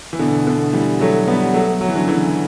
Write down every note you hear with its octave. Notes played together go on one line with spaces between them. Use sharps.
E3
B2 D3
B2 D3
E3 G3
F#3 A3
G3 B3
F#3 A3
F#3
E3
D3 F#3
C#3 E3